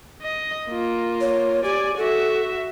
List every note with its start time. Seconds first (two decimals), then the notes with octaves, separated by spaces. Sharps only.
0.22 D#5
0.69 A#3 F4
1.21 C#5
1.64 G4 D5 G#5
1.97 F#4 A4 E5